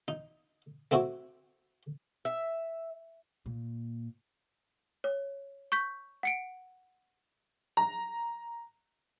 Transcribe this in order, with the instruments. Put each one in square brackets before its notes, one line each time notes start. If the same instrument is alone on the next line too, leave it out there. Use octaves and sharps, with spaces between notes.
[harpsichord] D#4
A3 C4 E4 F#4
[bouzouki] E5
[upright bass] A#2
[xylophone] C#5
C#6 G6 B6
F#5 C#7 D7
[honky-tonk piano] A#5